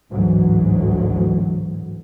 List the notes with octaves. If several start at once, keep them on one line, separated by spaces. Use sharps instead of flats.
A1 D2 G#2 E3 F#3